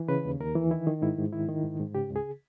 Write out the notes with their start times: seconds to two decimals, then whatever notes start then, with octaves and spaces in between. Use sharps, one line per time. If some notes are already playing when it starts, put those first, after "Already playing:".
Already playing: E3
0.08 C#3 B4
0.25 D#2
0.40 D#2 A#4
0.55 E3
0.71 D#3 E4
0.87 D#3
1.02 G#2 E4
1.18 G#2
1.32 D#3 E4
1.48 D#3
1.64 G#2
1.79 G#2
1.95 C#3 G4
2.10 C#2
2.16 G#4